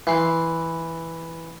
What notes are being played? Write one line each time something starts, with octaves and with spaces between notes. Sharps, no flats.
E3 C6